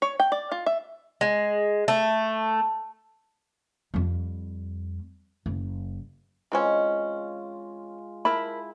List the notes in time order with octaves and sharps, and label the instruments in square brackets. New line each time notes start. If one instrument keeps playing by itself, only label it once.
[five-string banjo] C#5
G5
D5
F4
E5
[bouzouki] G#3
A3
[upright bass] F2 G3
F#1
[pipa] E3 C4 C#4 [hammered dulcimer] G#3 F4
[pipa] E4 [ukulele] A#4 A5 B5